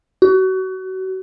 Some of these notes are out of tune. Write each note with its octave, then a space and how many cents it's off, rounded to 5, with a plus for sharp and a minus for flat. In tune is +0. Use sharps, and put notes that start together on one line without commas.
F#4 +30